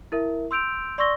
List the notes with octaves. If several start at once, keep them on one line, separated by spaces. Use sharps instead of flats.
E4 A#4 E5
C6 E6 G6 D7 F7
D5 C6 C#6 E6 A#6 G7